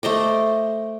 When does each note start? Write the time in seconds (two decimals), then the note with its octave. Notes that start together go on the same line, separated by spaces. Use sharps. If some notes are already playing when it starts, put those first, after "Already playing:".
0.03 A3 C5 D#5 D6